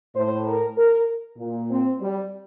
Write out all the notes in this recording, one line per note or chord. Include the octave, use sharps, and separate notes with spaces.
A2 C5
A#4
A#4
A#2
C4
G3